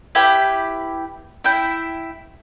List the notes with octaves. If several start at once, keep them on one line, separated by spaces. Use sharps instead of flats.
E4 G4 B4 G5
E4 G5